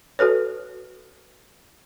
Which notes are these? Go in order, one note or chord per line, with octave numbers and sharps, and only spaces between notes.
F#4 A4 B4 C#5